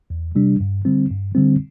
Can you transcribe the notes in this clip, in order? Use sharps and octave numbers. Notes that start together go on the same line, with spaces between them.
E2
C3 G3 D4
G2
D3 G3 C4
G2
D3 G3 C4